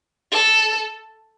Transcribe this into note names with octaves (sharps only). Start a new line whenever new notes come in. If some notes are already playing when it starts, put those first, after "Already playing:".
A4